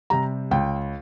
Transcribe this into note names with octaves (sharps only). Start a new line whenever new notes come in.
C3 G3 A#5
C#2 G5